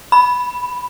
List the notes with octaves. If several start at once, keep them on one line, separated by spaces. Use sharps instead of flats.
B5